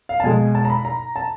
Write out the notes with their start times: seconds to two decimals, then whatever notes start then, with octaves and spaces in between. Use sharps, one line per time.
0.09 F5
0.20 A5
0.24 B2 G#3 G#5
0.55 A5
0.65 A#5
0.70 B5
0.85 A#5
1.16 A5